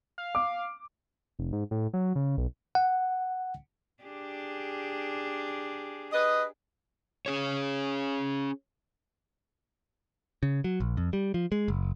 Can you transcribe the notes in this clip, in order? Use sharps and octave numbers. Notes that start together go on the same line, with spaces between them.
F5
D6
F1
G#2
A2
F#3
C#3
B1
F#5
D4 G4 G#4
B4 D#5
C#4 G#4 C#5
C#3
F#3
A#1
F2
G3
F3
G#3
F#1